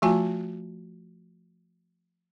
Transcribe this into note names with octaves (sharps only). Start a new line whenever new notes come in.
F3 A3 F4 F#4 G#5 A5